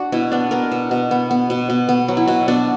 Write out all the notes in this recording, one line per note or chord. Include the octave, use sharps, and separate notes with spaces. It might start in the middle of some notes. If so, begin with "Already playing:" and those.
Already playing: D4 F#4
B2 E4
B3 D4
B3 A#4
B2
B2
B3
B3
B2
B2
B3
F#3
E4
B2 F#4
B2 D4